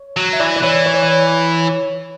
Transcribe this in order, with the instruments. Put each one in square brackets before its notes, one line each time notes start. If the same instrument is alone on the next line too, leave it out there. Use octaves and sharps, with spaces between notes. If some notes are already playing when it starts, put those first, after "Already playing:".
Already playing: [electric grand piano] C#5
[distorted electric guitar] F#3
[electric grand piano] E5
[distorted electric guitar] E3 [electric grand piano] D5
[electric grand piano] D5
[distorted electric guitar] E3 [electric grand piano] C#5
[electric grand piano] C#5
D5
C#5